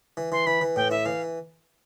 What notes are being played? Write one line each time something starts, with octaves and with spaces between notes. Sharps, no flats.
E3
E3 C6
E3 B5
E3
A2 G5
E4 E5
E3 F5